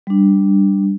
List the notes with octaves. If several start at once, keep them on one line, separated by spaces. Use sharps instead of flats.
G3 D4